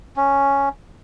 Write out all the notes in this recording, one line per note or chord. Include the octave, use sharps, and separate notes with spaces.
C#4